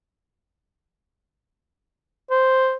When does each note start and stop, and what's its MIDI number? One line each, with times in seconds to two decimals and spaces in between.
2.31 2.77 72